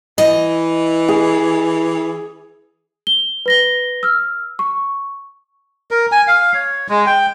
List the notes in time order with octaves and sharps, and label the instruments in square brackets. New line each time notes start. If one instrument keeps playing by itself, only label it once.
[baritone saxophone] E3 [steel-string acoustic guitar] D#5
[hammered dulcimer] G#4
[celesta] G7
B4 A#6 G7
E6 F6
C#6
[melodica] A#4
G#5
F5
C#5
G#3
G5